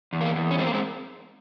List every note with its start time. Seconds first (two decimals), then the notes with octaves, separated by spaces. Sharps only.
0.13 E2
0.21 A#3
0.35 E2
0.51 C#4
0.58 G#3 C4
0.66 A#3
0.73 G#3 C4